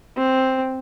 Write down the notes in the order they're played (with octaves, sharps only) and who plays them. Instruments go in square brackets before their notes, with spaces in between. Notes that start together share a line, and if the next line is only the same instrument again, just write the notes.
[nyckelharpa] C4